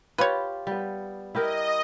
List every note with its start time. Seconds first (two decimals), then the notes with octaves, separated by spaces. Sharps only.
0.18 F4 G4 B4 C#5
0.67 G3 B3
1.35 E4 G4 A#4 D#5